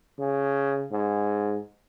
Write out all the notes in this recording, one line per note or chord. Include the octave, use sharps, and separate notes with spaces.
C#3
G#2